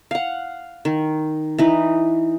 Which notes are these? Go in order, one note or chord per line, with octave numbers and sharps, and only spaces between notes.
F5 F#5
D#3
E3 D#4 B4